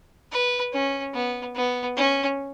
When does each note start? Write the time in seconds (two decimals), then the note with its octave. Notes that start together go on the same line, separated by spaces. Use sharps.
0.32 B4
0.73 C#4
1.14 B3
1.56 B3
1.96 C#4